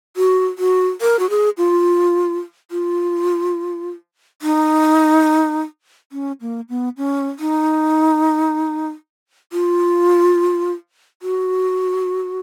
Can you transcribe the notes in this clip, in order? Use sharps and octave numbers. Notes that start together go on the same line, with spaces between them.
F#4
F#4
A#4
F#4
G#4
F4
F4
D#4
C#4
A#3
B3
C#4
D#4
F4
F#4